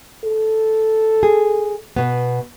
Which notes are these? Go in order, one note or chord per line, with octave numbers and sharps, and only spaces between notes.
A4
G#4
B2 B3